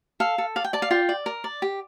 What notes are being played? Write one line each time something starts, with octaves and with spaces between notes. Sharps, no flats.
A4 F5
A4
D5 F5
G5
D5 A5
F5
F4 G5
D5
A#4
D5
G4